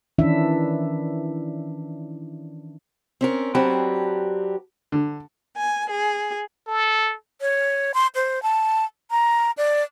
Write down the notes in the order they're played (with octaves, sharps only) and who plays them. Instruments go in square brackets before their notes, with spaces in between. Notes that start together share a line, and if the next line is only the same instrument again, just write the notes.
[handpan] D#3 E3 C#4 D4 E4 E5
[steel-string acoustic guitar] C4 C#4 A#4
[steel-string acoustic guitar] F#3 C4 D4 [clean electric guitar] G4 B4
[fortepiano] D3
[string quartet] G#5
G#4
[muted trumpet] A4
[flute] C#5
C6
C5
A5
A#5
D5